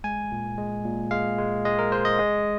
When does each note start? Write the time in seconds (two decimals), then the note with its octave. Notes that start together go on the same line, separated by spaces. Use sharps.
0.04 G#3 G#5
0.32 A#2
0.58 G#3
0.85 A#2
1.11 G#3 F5
1.38 G#3
1.65 G#3 D#5
1.79 A#4
1.92 G#3 C5
2.05 D#5
2.19 G#3